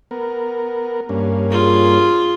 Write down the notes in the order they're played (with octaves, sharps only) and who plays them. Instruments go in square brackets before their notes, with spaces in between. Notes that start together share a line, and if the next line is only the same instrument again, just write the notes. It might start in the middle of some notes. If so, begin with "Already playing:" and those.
[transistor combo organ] B3 A#4
G2 A#3 C#4
[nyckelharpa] F4 G#4